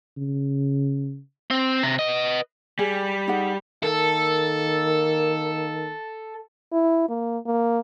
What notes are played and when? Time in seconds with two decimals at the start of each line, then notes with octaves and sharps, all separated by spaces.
0.17 C#3
1.51 C4
1.83 C3
1.99 B4 D#5
2.79 G3 G#4
3.27 D#4 G#4 F#5
3.83 D#3 A#3 A4
6.72 E4
7.09 A#3
7.46 A#3